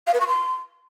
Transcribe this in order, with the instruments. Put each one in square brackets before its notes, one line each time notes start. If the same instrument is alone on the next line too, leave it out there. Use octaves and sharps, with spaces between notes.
[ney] F5
B4
C#6
C6